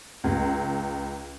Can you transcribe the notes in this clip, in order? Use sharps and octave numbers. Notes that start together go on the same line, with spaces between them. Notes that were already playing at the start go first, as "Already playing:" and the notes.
C#2